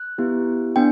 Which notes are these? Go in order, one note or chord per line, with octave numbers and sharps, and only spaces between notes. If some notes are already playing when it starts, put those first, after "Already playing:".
Already playing: F#6
B3 E4 G4
B3 D4 G5